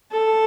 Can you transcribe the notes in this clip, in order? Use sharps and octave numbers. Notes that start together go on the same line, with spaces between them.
A4